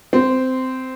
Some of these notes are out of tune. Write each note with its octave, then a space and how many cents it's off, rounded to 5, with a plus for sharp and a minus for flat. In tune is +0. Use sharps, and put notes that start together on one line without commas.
C4 -15